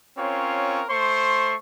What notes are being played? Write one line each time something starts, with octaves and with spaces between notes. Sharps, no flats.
C4 C#4 F4 A#4 C#5
A3 C5 C6 C#6